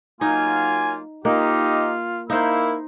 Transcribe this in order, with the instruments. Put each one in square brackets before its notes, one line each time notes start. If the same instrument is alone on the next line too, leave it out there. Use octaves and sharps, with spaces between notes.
[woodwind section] F#3 A#3 F4 [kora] D#4 [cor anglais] G#5
[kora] A#3 [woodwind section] D#4 G4 [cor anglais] F4
[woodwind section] A#3 E4 [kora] D#4 C5